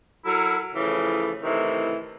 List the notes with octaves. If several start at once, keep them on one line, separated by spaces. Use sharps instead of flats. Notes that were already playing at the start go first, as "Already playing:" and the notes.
F#3 E4 A4 A#4
A2 C#3 E3 F3
A2 C3 D#3 E3